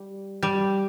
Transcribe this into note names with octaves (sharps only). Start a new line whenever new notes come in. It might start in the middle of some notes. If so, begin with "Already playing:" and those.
Already playing: G3
G3